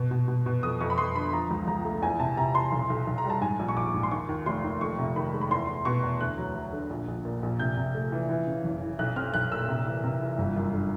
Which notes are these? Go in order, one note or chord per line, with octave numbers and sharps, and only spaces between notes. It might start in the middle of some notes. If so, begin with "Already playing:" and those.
Already playing: B2
B2
B2
B2
F2 D#6
F2 C#6
B5
F2 C6
D3 B5
F3 A#5
C#2
C#2 A#5
A3
E2 G#5
C3 A5
C3 A#5
E2 C6
B1
B1
B1
A#5
G3
A5
G#2 G#5
A#1
C#6
A#1 D6
G#2
C6
D#2 C#6
D#2
F1 C6
D#2
F2 C#6
C3
D#3 B5
G#3
B5
E2 C6
E2
B2 C#6
E2
D2 F#6
F#3
F#3
D3
A#1
A#1
A#2
A#1
C3 G6
C3
A3
E3
E3
C#3
F#1
F#1
B1 F#6
C4 F6
B1 F#6
A#2 E6
C3
E3
C3
E3
G1
F#2
D3